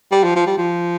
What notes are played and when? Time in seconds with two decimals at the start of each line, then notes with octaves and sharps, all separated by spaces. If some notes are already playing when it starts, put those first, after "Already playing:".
0.12 G3
0.24 F3
0.36 F3
0.47 G3
0.58 F3